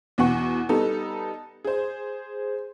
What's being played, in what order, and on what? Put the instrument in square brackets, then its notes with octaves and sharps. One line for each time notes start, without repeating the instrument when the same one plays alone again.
[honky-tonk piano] E2 B2 F#5 C#6
G3 B3 D#4 A4
G#4 C5